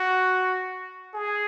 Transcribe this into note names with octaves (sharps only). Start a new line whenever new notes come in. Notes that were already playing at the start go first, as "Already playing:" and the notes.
Already playing: F#4
G#4